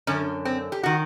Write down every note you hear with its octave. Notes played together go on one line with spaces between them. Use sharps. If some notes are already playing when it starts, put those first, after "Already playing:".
F#2 D3 C#4
C4
G4
D#3 F#4